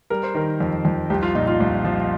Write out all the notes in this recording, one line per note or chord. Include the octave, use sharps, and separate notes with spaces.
G3 A#4
C5
D#3 A#4
F2
F2
C2 G4
F4
A#2 D#4
F4
C2
F3